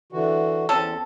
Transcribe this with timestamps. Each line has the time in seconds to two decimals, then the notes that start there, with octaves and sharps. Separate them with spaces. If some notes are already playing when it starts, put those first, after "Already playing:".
0.12 D3 E3 F#4
0.69 E2 C4 C#4 A4